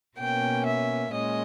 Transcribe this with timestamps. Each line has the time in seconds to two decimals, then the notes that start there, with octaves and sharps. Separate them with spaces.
0.18 B2 A#3 C#4 G5
0.66 E5
1.13 A#2 G#3 C#4 D#5